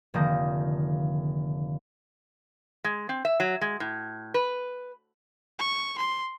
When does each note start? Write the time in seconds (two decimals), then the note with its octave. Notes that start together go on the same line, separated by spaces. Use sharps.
0.14 F1 D3 D#3 A#3 D#6 G6
2.84 G#3
3.09 C4
3.25 E5
3.40 F#3
3.61 G#3
3.80 A2
4.34 B4
5.59 C#6
5.98 C6